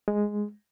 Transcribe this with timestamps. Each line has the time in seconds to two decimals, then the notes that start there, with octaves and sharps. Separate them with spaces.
0.08 G#3